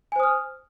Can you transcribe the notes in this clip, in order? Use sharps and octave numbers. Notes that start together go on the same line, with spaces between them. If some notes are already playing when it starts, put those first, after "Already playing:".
C5 G#5 D#6 F6